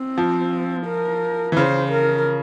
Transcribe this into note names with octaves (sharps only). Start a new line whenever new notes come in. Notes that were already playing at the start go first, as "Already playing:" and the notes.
Already playing: C4
F3
A#4
E3
C#3 C5
A#4